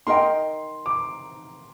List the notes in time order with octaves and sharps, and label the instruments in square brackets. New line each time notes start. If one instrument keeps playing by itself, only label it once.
[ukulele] D#4 A#4 D#5 G5 [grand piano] C6
[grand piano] D6